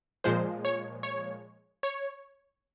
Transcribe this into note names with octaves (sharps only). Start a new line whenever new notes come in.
A#2 F3 G#3 C5
C#5
C#5
C#5